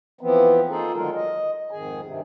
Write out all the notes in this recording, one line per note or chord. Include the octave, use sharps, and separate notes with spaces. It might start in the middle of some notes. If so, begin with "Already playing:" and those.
E3 F3 B3 C4
A#3 D#4 F4 G#4 A4
D3 D#3 F#3 G#3 F4 A#4
D#5
F2 G#2 D#3 G#4 G#5
G2 C3 D#3